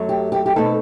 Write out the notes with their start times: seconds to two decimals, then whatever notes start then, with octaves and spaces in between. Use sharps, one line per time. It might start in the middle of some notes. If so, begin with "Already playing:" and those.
Already playing: F#2 F#3 A3
0.09 G4
0.32 G4
0.46 G4
0.56 B2 A3 C4 D#4 A4